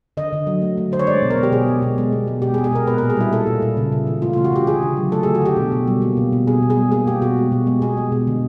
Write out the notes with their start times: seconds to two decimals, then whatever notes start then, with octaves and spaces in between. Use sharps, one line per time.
0.17 D3 D#5
0.33 D3
0.47 F#3
0.62 A3
0.77 D3
0.92 D3 C5
0.99 C#5
1.07 G#3 D5
1.22 B2
1.30 A#4
1.37 G#3
1.43 G4
1.52 B2 G#4
1.67 G#3
1.82 B2
1.98 G#3
2.12 B2
2.27 G#3
2.42 B2 G4
2.54 G#4
2.58 G#3
2.64 G#4
2.72 B2 A#4
2.87 A#2 B4
2.98 A#4
3.02 A#2
3.10 G#4
3.17 G3 E4
3.32 A#3 A4
3.47 A#2
3.62 A#2
3.77 C#3
3.92 C#3
4.07 E3
4.22 A3 F4
4.33 F4
4.37 C#3
4.44 F#4
4.52 C#3 G4
4.67 D3 G#4
4.82 D3
4.97 F#3
5.12 A3 A4
5.23 G#4
5.27 D3
5.35 F#4
5.42 D3 G4
5.57 B2
5.72 B2
5.87 G3
6.02 A#3
6.17 B2
6.32 B2
6.47 B2 G#4
6.62 B2
6.70 G#4
6.77 G3
6.92 A#3 G#4
7.07 B2 G4
7.22 B2 F#4
7.37 G#3
7.52 B2
7.67 G#3
7.82 B2 G#4
7.97 G#3
8.12 B2
8.27 D3